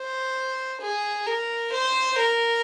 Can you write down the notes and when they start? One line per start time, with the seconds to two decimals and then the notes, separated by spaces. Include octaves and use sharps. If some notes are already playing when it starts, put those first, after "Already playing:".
Already playing: C5
0.82 G#4
1.26 A#4
1.73 C5
2.19 A#4